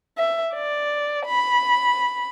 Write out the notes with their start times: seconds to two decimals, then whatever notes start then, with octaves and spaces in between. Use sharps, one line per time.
0.18 E5
0.54 D5
1.26 B5